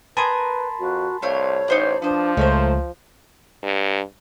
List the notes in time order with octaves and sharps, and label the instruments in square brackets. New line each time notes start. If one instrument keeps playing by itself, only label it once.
[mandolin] A#4 G#5 D#6 [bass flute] B4 [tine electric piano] A5 B5 C6
[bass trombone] F2 [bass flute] F#4
[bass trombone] C2 [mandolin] A3 C4 F5 [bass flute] C#5
[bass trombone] A1 [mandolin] D#4 C5 D5
[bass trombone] F3 [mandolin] B3 C5 [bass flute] D4
[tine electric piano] C#2 [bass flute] A3 [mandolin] C#4 A#4 C5
[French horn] G2